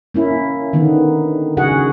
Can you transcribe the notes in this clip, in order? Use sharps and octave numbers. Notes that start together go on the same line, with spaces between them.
A#3 C#4 E4
D3 D#3 B3
C#3 F#4 G#4 F#5